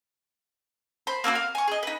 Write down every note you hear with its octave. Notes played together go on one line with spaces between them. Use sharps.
C5 B5
A#3 C4 D4 F#4
F5
G#5 C#6
G#4 D#5
D#4 B4